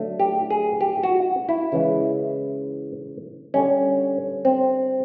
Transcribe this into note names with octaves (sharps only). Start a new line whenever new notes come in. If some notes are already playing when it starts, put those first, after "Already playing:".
Already playing: D3 F#3 A3
G4
G#4
G4
F#4
E4
C#3 E3 G#3
D3 G3 C#4
C4